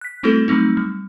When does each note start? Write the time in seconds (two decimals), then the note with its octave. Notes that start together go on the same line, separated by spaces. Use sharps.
0.01 F#6 B6
0.23 G3 A3 C4 E4 F#4 A4
0.48 F#3 G3 A3 C4 D#4
0.77 G3